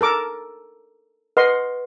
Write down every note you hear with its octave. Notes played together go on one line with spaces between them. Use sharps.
A4 A#4 D6
B4 D#5 F#5 C6